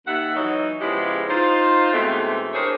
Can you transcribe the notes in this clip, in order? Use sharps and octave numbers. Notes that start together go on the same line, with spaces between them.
D#2 E5 F#5
E3 F#3 D#4
C#3 F3 G#3 B3 E4 G4
D#4 F4 C5
B2 D#3 E3 G#3 A3 C4
D4 G4 G#4 A#4 C5 C#5